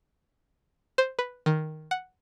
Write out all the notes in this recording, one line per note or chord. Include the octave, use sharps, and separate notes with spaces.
C5
B4
D#3
F#5